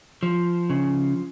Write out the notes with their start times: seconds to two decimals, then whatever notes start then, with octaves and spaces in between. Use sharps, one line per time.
0.23 F3
0.70 C#3